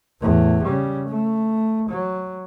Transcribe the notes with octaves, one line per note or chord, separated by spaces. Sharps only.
E2 A2
C#3 G3
A3
F#3